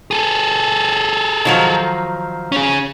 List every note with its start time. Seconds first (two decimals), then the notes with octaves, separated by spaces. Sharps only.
0.11 G#4 A4
1.45 D#3 F3 F#3
2.52 C#4 G#4